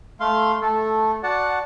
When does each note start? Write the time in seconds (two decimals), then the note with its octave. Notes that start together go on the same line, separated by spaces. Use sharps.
0.20 A3 F5 C6
0.62 A3 A4
1.23 F#4 D5 F#5 A5